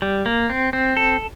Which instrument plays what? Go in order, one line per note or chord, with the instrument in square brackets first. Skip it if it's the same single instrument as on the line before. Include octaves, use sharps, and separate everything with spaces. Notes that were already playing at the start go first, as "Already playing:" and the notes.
[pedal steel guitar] G3
A#3
C4
C4
A4